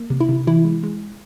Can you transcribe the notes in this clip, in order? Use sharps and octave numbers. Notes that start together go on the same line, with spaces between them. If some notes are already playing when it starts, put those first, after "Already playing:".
Already playing: A#3
C3
E4
C3
E3 E4
G#3
G#3